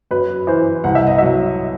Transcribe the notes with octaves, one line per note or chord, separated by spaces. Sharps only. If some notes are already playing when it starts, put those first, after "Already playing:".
F#2 B4
E3 C5
C2 F#5
E5
D#5
B2 F#3 E5